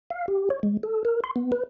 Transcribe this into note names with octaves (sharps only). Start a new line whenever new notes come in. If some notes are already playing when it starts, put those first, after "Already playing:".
F5
G4
C#5
G#3
A4
A#4
C6
B3
B4